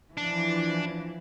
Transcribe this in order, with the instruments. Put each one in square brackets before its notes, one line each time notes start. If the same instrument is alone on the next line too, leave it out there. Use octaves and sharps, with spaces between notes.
[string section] E3 F3 [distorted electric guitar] D4